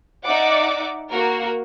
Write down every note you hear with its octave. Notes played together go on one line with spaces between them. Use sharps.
D#4 D5 E5 F#5 D6
A#3 F#4 A#4